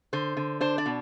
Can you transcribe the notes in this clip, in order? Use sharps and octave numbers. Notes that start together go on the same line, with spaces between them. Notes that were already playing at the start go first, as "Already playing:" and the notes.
D3 C5
D3
D4 C5
D5
B2